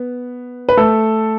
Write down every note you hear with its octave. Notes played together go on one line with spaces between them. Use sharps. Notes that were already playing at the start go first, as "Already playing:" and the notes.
Already playing: B3
B4
A3 A4